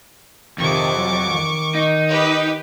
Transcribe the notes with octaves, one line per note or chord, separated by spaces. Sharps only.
F2 C3 D#3 C#6 D6
F#3
D#3
D#4
G4 B4